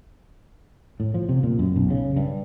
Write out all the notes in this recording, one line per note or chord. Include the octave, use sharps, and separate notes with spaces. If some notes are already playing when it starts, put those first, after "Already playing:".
A2
F3
C3
A#2
F#2
B1
C#3
G2